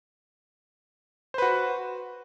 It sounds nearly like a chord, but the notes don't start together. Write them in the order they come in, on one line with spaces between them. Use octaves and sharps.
C5 B4 F#4